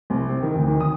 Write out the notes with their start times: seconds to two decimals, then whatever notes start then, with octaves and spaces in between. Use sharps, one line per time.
0.10 C2
0.29 C4
0.42 D#3
0.55 D2
0.68 D#3
0.80 D#6